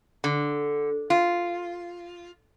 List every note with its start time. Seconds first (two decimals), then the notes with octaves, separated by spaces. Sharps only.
0.24 D3
1.10 F4